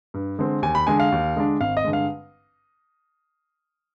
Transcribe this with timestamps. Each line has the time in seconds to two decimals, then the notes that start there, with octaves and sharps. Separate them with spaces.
0.14 G2
0.39 D3 G#3 C4
0.62 D#2 G#5
0.75 B5
0.87 D3 G#3 D4 G#5
1.00 F5
1.12 D#2
1.36 D3 G#3 D4
1.61 G#1 F5
1.77 D#5
1.84 G2 D3 G#3
1.93 F5